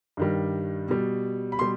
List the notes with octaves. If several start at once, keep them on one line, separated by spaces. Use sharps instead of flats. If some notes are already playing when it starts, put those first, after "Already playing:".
G2 D#3 G3
B2 G3
B5
B2 G3 C6